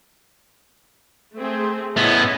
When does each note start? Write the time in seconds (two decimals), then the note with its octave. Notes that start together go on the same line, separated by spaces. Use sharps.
1.38 A3 C4 G#4
1.97 A2 B3 C#4 E4 D#5